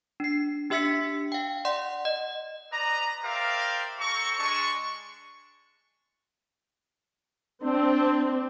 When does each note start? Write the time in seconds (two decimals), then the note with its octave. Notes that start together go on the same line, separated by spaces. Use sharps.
0.20 D4 C7
0.70 D4 G4 E5 E6 B6 C#7
1.32 F5 G5
1.65 D5 F#5 C6
2.05 D#5
2.72 B4 D5 D#5 A#5
3.23 G4 A#4 C5 D5 E5 F5
4.00 C4 A4 A#5 C#6
4.38 G#3 D4 C#6
7.63 C4 D4